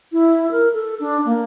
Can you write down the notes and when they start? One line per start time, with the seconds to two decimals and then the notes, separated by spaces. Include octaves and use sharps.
0.12 E4
0.51 A#4
0.73 A4
1.00 D4
1.25 A#3